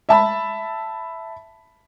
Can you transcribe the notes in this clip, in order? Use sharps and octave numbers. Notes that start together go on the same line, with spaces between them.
E5 A5 B5